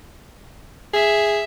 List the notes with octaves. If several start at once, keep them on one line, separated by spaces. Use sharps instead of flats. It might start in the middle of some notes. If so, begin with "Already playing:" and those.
G#4 E5